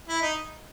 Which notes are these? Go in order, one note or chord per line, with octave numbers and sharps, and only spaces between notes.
E4
D#4